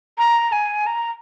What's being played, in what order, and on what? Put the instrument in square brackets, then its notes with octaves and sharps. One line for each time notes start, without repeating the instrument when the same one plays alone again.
[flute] A#5
G#5
A#5